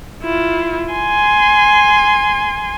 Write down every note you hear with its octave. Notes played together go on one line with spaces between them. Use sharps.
E4 F4
G#5 C6